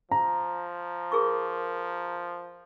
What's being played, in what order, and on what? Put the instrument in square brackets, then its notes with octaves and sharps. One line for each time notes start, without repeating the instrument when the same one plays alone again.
[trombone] F3 [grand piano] A#5
[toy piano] G#4 A#4 C#6